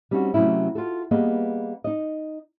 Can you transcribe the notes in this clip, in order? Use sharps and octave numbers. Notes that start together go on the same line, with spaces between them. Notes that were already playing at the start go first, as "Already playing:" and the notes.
G3 C4 C#4 D#4 F#4
C3 F#3 A3 C#4 E4
F4 F#4 A4
G3 A#3 B3 G#4 D#5
D#4 D#5